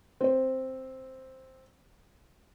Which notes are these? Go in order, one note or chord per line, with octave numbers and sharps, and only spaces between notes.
C4 C5